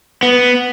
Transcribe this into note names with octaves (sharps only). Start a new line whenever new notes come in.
B3